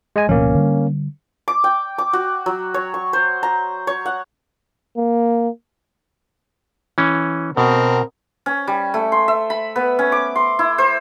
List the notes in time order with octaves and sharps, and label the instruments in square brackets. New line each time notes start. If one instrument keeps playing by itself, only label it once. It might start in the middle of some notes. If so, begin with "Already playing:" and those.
[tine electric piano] G#3 D#5 G#5
[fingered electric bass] D1 B2 F3 [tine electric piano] A#3 C#4
[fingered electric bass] D3 G3
[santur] D6
G5
D6
F#4
F#3
C#5
C#6
C5
A#5
C#5
F#5
[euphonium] A#3
[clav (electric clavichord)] E3 C#4
[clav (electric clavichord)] B2 [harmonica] C4 A#4
[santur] C#4
G3
A3
C6
E5
B5
B3
C#4
D6
C6
E4
C5